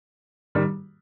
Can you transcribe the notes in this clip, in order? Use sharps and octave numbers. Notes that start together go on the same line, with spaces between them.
D#3 G3